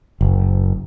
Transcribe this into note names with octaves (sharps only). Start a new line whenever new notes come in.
F#1